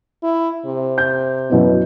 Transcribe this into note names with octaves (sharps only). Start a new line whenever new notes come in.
E4
C3
G6
F#2 B2 E4 F#4